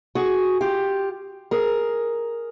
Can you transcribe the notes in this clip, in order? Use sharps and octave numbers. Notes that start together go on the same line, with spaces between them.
F#4 G#4
F4 G4
G#4 A#4